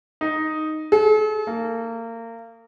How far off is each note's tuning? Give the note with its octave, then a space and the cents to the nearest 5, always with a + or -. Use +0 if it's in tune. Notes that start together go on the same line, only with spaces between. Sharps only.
D#4 +0
A4 -45
A#3 -30